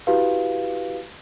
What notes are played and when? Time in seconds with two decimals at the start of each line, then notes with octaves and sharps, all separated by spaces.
0.07 E4 F#4 G4 B4 F5